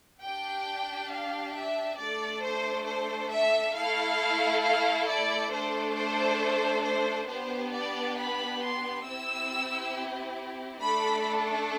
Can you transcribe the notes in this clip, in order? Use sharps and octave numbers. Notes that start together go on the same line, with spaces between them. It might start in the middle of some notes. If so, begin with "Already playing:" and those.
D4 G4 G5
F5
E5
A3 D4 A4 D5
C5
C5
E5
A3 E4 A4 F5
F5
D5
A3 D4 A4 C5
C5
C5
B3 D4 G4 C5
D5
B5
C6
C4 E4 G4 E6
A3 D4 A4 B5